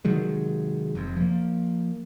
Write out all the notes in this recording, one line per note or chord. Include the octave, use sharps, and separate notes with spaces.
C3 D#3 F#3 G#3
F1 F2
F3 A#3